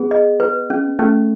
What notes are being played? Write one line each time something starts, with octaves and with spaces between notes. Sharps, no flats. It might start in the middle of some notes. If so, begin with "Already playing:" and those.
Already playing: B3 G#4
D#5
B4
C#4
A3 C#4